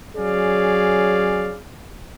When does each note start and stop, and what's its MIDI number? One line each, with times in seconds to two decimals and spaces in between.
0.17 1.57 54
0.17 1.57 61
0.17 1.57 68
0.17 1.57 74
0.17 1.57 77